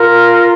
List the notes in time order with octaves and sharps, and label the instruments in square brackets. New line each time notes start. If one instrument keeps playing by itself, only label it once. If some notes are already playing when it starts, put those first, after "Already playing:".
Already playing: [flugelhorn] F4 [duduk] A#4